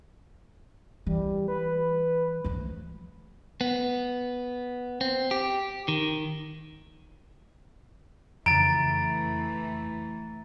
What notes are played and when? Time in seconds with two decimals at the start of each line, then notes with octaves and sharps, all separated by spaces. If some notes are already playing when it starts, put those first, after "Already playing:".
1.06 E3 G3
1.48 B4
2.44 F3 A3
3.61 B3
5.01 C4
5.31 G4
5.88 D#3
8.46 F2 C#3 E3 A3 A#5 A6 D7